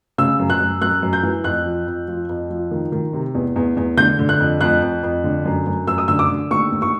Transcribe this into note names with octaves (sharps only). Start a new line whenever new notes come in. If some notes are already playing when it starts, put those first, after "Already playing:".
C#3 E6
F#2
F#6
F#2
F#2 F#6
F#2
G6
E3
F2 F#6
F3
F2
F3
F2
F3
D#3
D#3
C3
E2
E2
E2
D3 G6
D3
F#6
F2
F2 F#6
F2
F2
D3
F#2
F#2
F#2 E6
D#6
D3 E6
D6
D3
D#2 C#6
D#2
C#6